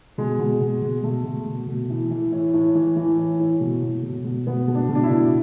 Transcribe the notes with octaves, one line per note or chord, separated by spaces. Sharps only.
B2 G#3
B2
B2
B2
B2 A3
B2
B2
B2
E3
E3
A2
A2
E3
E3
A2
A2
B2
B2
B2
B2
B2 B3
B2
D4
B2
D4
E4
B2